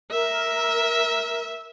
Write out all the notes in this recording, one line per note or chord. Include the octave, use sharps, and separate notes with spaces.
A#4 E5